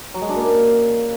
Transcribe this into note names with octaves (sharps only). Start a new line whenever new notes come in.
F#3
G#3
D4
A#3
C#3